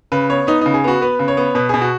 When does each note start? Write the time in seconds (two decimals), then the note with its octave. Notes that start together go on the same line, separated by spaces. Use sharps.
0.12 C#3 B4
0.30 B3 C#5
0.47 B3 D#4
0.61 C#3 D#4
0.74 G#4
0.84 B3 F#4
1.01 B3 B4
1.19 C#3
1.28 C#5
1.37 B3
1.55 B2 B4
1.69 B2 G#4
1.82 F#4